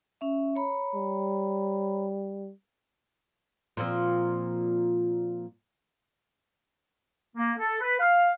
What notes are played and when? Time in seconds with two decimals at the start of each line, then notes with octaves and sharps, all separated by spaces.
0.21 C#4 E5
0.55 C#5 A#5 B5
0.94 G3
3.77 A#2 F3 C4
7.37 A#3
7.58 A4
7.80 B4
8.00 F5